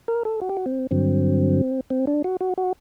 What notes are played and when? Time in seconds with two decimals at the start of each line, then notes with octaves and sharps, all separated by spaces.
0.08 A#4
0.25 A4
0.41 F#4
0.49 G4
0.57 F#4
0.66 C4
0.91 G2 D3 F#3 C4
1.90 C4
2.07 D4
2.24 F#4
2.41 F#4
2.58 F#4